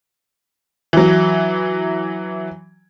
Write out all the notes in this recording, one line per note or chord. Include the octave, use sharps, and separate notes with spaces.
E3 F#3